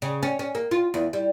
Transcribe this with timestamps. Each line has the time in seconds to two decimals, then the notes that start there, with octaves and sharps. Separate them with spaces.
0.02 C#3
0.23 C#4
0.39 C#4
0.55 A#3
0.71 F4
0.94 E2
1.13 G3